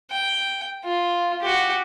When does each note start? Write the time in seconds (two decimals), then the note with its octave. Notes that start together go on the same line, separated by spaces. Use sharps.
0.10 G5
0.84 F4
1.41 F#4 G4